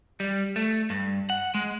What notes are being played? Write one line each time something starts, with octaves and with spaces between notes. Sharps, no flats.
G3
A3
G2
F#5
G#3